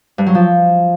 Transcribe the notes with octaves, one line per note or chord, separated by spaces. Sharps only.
G2
F#3
F3